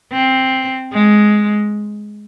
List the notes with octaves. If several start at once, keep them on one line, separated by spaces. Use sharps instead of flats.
C4
G#3